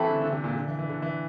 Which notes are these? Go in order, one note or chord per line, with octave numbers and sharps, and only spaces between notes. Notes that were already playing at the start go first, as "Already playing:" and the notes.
Already playing: E3 G3 A3 C4 E4 A4
D3
D3
C3
A#2
D3
E3
E3
D3
E3